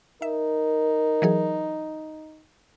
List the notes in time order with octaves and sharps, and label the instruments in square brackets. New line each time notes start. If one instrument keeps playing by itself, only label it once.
[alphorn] D#4 [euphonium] A#4 [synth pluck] E5
[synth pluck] E3 F#3 G#4